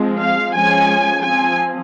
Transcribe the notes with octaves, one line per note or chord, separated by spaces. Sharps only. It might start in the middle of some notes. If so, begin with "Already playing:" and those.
Already playing: F3 G#3 C4
F5
F3 G#3 C#4 G#5
F3 C4 G#5